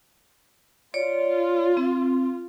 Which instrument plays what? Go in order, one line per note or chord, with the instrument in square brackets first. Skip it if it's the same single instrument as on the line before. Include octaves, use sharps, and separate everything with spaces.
[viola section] F4 [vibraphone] C#5 D5
[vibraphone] C4